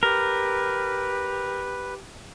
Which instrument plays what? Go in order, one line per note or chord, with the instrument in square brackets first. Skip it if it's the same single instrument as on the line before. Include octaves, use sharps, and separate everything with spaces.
[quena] G4 [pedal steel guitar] A#4 [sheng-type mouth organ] B4